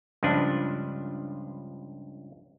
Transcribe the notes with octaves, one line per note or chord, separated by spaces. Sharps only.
C#2 G2 F3 D4